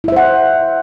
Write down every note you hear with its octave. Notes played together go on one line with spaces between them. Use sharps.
E4 C5 E5 F#5